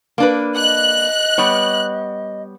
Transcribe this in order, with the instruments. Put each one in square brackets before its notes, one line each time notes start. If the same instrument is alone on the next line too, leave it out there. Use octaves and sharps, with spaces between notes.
[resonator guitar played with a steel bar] A#3 D4 B4
[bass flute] D#5 [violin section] F#6
[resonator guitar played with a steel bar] G3 B3 C#5